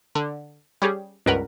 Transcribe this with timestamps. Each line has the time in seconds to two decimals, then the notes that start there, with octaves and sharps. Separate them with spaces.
0.15 D3
0.82 G3 C#4 G4 G#4
1.26 C#2 G2 A#4 B4 F#5